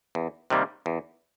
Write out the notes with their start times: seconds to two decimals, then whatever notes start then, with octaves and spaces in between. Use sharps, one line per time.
0.15 E2
0.50 C3 D#3 G3 A#3
0.86 E2